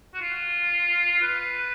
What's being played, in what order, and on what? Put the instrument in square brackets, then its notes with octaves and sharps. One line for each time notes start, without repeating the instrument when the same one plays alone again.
[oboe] F#4
F4
B4